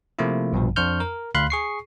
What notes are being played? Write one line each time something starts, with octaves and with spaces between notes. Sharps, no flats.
C3 F3 A3 A#3 E4
A#1 G2 B2 F3
F2 D4 C5 C#6 F6 G6
A#4
D2 F5 B5 C6 F#6
G#4 C#6 C7